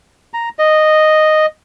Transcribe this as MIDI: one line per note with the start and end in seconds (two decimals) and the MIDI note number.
0.34 0.49 82
0.59 1.46 75